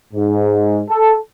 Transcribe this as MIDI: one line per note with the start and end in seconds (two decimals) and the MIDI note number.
0.14 0.81 44
0.88 1.15 69